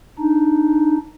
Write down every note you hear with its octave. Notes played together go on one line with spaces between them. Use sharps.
D4 D#4